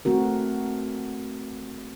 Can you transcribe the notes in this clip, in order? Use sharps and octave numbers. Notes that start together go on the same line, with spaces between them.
A3 C4 F#4 A#4